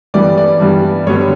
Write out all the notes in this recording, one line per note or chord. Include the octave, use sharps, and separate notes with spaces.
G2 E3 G3 B3 D5
D5
G2 E3 G3 B3
G2 D3 G3 B3 C#5